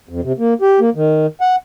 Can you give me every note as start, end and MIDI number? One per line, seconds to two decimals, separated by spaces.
0.09 0.21 41
0.23 0.32 48
0.38 0.54 58
0.61 0.80 67
0.80 0.90 58
0.95 1.26 51
1.41 1.56 78